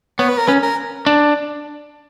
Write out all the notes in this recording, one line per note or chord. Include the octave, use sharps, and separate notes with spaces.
B3 C#5
B4
A#4
C#4 B4
A#4
D4